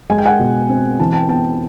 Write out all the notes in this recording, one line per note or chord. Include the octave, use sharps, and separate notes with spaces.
G#3 G#5
G5
F#5 G#5
B2
C4
E3 A5
G5 A5
B3 G5 A5